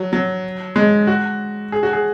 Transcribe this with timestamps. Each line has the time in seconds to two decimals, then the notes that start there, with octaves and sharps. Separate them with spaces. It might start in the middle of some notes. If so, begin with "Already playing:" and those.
Already playing: F#3
0.13 F#3
0.76 G#3
1.07 F#4
1.72 G#4
1.83 F#4
1.93 G#4